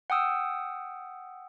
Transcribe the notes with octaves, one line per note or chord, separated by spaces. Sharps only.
F#5 G5 D#6 E6